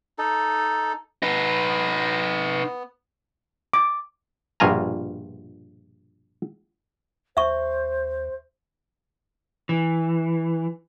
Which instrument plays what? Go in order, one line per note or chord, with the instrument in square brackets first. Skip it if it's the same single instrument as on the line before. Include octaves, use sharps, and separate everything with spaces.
[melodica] D#4 A4
[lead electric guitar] D#4 B4 [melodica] F#5
[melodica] B3
[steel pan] D6
[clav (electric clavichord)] A#1 G2 B2 F4 G#5 A#5
[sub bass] D#2 [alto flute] C5 [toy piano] E5 C#6
[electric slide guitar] E3